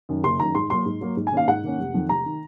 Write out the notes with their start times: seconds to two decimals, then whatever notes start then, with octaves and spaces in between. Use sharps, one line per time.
0.09 F#2 D#3
0.24 F#1 C6
0.40 F#2 D#3 A#5
0.55 G#2 C6
0.70 F#3 A#3 C6
0.86 G#2
1.01 F#3 A#3
1.17 G#2
1.27 G#5
1.32 D#3 A#3 C#4 F5
1.48 G#2 F#5
1.63 D#3 A#3 C#4
1.78 F1
1.94 F2 D#3
2.09 F1 A#5
2.26 D#3